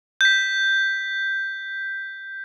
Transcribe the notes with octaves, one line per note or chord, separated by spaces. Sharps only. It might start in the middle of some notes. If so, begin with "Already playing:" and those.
G6 B6